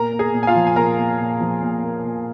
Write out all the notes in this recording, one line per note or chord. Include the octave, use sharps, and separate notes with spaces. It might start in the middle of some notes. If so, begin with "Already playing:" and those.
Already playing: A#2 A#4 A#5
A#3
G#4 G#5
A#2
G#5
F4 F5
F3
G#5
A#2 A#4 A#5
A#3
A#2
F3
A#2
A#3
A#2